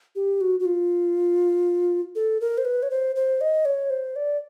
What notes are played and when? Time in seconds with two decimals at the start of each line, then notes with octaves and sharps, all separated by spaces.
0.16 G4
0.41 F#4
0.60 F#4
0.65 F4
2.15 A4
2.41 A#4
2.58 C5
2.65 B4
2.83 C#5
2.91 C5
3.16 C5
3.41 D#5
3.65 C#5
3.90 C5
4.16 D5